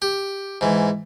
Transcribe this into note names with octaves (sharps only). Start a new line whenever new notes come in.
G4
G#2 E3